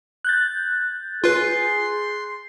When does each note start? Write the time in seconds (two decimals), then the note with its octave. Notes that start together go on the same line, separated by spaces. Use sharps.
0.25 F#6 G6 A6
1.24 F4 G#4 B4 C6